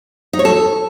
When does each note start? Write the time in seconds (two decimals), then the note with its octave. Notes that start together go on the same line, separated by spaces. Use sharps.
0.33 D#4
0.39 C#5
0.45 A4